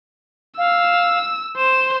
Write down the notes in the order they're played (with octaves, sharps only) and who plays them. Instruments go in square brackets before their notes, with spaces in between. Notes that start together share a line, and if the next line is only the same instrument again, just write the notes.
[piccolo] F5 [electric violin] E6
[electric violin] C5 [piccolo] E7